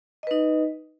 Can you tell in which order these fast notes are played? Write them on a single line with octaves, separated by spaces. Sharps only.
D#5 B4 D#4